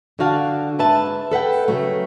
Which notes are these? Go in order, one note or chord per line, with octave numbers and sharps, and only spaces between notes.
D3 D4 F#4 F5 A5
G#2 B4 E5 A5
A4 B4 F#5 G5
C#3 F#3 A3